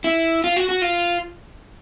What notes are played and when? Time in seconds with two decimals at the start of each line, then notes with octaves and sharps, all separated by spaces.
0.04 E4
0.44 F4
0.56 F#4
0.69 F#4
0.82 F4